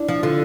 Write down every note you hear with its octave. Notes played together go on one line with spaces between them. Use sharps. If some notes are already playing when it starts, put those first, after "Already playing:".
Already playing: D4 E4
F3
D3 F4